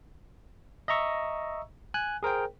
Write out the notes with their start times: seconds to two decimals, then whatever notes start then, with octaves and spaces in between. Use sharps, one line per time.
0.88 D#5 E5 A#5 C#6 E6
1.94 G#5 F#6
2.23 G#4 A#4 C5 G5